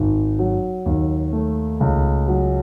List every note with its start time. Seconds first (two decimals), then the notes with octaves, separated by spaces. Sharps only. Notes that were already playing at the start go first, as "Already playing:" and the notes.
Already playing: G#1
0.39 F#3
0.86 D#2
1.32 A3
1.80 C#2
2.28 F#3